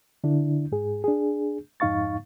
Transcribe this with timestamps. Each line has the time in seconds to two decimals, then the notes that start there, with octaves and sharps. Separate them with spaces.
0.24 D3 D4 E4
0.72 G#2 G#4
1.04 D4 G#4
1.80 F2 G#2 D#4 F5 C#6 A6